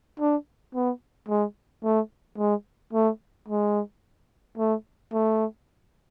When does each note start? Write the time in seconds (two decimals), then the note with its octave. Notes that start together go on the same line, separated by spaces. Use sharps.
0.20 D4
0.75 B3
1.29 G#3
1.84 A3
2.38 G#3
2.93 A3
3.48 G#3
4.58 A3
5.13 A3